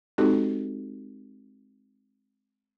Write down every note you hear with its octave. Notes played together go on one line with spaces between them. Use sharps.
G#3 C4 D#4 F#4 G4 A4